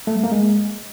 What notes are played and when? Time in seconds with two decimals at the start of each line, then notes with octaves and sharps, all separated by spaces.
0.07 A3
0.15 G3
0.24 A#3
0.32 G#3